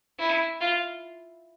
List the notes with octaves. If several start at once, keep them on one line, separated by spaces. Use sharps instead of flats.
E4
F4